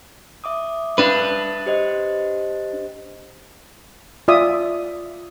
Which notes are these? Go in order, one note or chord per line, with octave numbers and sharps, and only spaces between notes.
E5 D6 D#6
D4 B4
G4 C5 D#5
F4 D5 E5 D#6